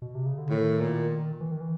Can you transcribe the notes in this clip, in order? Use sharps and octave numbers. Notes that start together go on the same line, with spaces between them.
B2
C3
C#3
D3
A2 D#3
A#2
E3
D#3
E3